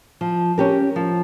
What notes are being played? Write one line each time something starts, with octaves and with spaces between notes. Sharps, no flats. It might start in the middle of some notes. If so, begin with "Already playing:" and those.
F3
C#4 G4 A#4
F3